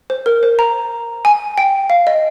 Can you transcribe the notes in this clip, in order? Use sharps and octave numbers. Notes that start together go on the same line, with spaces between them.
C5
A#4
C5
A#5
G#5
G5
F5
D#5